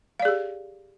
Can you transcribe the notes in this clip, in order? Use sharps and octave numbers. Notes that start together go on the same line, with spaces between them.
G4 G#4 D5 F5